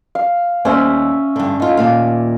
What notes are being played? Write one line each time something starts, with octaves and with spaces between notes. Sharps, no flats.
F5
D#2 G3 C#4 C5 E5
G2 D3
D#4 F4
D#2 A#2 F5